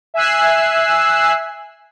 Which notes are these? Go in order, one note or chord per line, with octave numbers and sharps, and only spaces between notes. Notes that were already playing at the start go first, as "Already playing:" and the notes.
E5 G#5 E6 F#6 C7